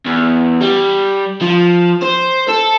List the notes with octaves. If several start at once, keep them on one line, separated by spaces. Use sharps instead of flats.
E2
G3
F3
C5
A4